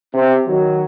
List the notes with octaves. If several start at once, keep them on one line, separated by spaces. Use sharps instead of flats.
C3
D#3 F#3